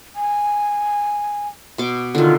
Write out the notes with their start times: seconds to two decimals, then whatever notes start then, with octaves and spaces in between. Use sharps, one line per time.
0.15 G#5
1.78 B2 D6
2.15 D3 D#3 F4